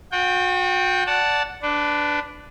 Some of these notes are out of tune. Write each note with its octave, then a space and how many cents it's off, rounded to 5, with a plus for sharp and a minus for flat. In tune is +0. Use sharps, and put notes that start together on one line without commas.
F#4 -35 G5 +0
D5 -15 F#5 +0 A5 +0
D4 +0 B4 +20